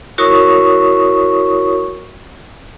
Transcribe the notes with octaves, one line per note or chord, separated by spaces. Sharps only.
E4 F#4 A#4 C#5 C#6 D#6